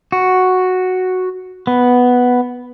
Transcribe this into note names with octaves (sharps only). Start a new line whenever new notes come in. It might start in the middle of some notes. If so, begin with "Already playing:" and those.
F#4
B3